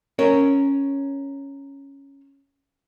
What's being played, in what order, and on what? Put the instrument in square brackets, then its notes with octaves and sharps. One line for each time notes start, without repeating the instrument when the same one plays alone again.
[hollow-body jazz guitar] C#4 A#4 C#5